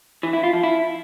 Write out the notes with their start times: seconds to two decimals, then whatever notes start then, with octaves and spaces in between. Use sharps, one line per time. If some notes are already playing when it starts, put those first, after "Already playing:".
0.23 E3
0.33 E4
0.43 F4
0.53 F3
0.63 E4